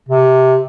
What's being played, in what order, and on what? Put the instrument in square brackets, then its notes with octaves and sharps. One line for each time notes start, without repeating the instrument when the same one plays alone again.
[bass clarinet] C3